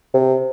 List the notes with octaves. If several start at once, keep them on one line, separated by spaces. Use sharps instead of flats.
C3